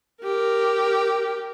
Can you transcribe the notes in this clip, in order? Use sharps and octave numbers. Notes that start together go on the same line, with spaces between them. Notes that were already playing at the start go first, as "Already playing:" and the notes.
G4 A#4